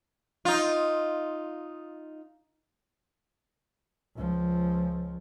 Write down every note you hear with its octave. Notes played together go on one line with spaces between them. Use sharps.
D#4 F4
C#2 F3